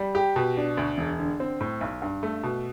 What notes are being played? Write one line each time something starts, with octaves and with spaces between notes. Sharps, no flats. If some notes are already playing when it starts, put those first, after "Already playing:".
Already playing: G3
G4
B2
D4
D2
E1
D3
C4
A2
B1
G2
A3
B2